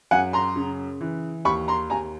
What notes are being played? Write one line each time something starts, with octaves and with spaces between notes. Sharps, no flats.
F#2 F#5 G#5
A#5 C6
C#3
E3
D#2 B5 C#6
A#5 C6
D#2 G#5 A#5